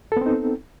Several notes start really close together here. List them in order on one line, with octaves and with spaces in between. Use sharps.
A4 B3 C4 D#4